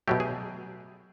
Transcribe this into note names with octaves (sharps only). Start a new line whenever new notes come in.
B2 F#3 A3 G4
G#4